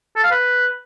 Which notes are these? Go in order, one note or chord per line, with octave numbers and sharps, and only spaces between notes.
A4
F5
B4